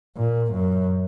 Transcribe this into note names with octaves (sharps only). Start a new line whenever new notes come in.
A#2
F#2